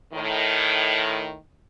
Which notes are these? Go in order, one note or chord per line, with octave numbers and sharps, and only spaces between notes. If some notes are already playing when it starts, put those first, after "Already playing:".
A2 D#3